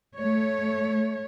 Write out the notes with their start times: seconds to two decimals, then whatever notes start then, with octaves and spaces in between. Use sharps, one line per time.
0.17 A3 C#5